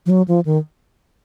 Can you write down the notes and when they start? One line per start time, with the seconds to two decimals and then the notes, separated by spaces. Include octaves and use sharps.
0.06 F3
0.10 F#3
0.28 F3
0.45 D#3